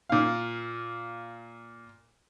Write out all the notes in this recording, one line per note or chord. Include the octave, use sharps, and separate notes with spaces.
A#2 F5